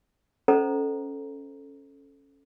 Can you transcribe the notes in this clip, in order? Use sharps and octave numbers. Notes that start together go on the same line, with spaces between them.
C#4 A4 C5 D#5 A#5